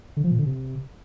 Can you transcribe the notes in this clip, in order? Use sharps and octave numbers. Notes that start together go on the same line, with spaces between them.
D3
F3
A#2
D3
C3